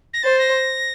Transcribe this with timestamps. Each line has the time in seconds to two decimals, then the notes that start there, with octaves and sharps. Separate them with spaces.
0.13 A#6
0.22 C5 A6
0.39 A#6